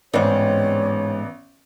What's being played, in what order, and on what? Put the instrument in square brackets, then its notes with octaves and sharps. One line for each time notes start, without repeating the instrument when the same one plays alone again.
[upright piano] A1 B3 D5 [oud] G#2 C4 [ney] C#5